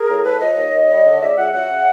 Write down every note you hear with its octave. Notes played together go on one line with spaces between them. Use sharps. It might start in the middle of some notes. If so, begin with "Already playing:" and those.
Already playing: G#4 A#4
A2
A2 A4 B4
F3 C#5 D#5
D#2
D#2
G3
D3
C#2 D5 E5
C#2 E5 F#5
F#3 E5 F#5
C#3